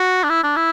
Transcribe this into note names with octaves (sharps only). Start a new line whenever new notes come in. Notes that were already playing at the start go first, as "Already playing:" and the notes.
Already playing: F#4
D4
E4
D4
E4